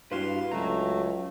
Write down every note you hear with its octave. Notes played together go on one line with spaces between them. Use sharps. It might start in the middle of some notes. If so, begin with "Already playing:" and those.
G2 E4 F#4 B4 F5 C6
C#2 F#3 A3 A#5